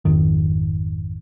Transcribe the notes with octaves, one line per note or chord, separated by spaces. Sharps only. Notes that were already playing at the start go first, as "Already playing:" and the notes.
G#1 F2 D#3